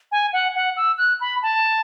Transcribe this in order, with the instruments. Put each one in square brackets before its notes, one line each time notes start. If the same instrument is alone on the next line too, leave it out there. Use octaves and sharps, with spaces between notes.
[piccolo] G#5
F#5
F#5
E6
F#6
B5
A5